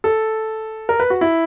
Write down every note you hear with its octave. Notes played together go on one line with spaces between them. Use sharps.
A4
A#4
B4
F#4
E4